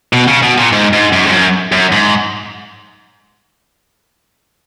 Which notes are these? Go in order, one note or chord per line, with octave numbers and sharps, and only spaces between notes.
B2
C#3
B2
A#2
G#2
G#2
F#2
G#2
F#2
F#2
G#2